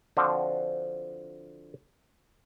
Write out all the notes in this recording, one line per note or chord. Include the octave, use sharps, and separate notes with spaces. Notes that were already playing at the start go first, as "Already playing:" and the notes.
D3 F3 C4 D4 F4 F#4